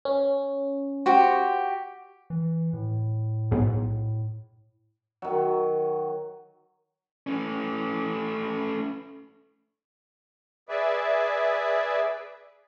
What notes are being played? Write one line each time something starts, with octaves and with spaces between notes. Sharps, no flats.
C#4
F#4 G4 C5
E3
A2
B1 G#2
D#3 F#3
A3 C#4
G#4 B4 D5 E5